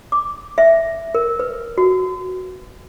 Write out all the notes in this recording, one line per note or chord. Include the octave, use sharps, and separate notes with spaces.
D6
E5
A#4
B4
F#4